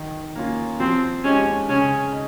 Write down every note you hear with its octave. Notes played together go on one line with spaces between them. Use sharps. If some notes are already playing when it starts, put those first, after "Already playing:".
Already playing: D#3
A#3 C#4 F4
F3 C4
G#3 C#4 D#4 G4
C#3 C#4
D#4